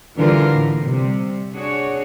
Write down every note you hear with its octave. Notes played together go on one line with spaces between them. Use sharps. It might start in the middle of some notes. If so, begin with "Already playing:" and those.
D3 E3 G3 D4 F4 A#4
A2
C3 G3
D4 F#4 G#4 C#5